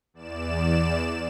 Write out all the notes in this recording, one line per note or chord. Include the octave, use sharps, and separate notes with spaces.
E2 D5 E7